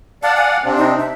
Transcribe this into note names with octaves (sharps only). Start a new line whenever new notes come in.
D5 F5 F#5 A5
G#5
C3 C4 D4
D#4
E5